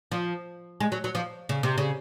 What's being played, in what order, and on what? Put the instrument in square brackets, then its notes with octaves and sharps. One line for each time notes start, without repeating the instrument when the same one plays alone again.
[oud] F3
G#3
F#3
F#3
F3
C#3
C3
C#3